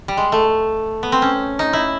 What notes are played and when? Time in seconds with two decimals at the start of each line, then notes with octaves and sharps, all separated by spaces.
0.08 G3
0.17 G#3
0.32 A3
1.03 B3
1.12 C4
1.22 C#4
1.59 D#4
1.73 E4